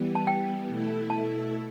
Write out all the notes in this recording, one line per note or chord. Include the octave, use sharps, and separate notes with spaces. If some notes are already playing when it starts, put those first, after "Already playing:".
Already playing: E3 G3 B3
A5
G5
B2 A3 E4 A4
A5